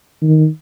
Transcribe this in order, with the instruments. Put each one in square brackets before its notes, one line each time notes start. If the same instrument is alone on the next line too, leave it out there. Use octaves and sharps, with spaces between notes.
[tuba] D#3